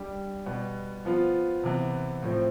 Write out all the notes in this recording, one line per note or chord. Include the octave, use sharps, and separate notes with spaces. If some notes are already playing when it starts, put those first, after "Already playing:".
Already playing: G3 D4 G4
B2 G3 B3
F3 B3 F4
C3 E3 B3
A2 F3 C4